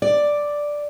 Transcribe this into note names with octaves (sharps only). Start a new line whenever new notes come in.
D5